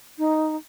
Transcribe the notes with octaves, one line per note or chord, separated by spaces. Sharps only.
D#4